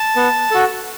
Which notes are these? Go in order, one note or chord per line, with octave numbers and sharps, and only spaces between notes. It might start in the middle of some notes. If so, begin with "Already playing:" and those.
Already playing: A5
B3
F#4 A4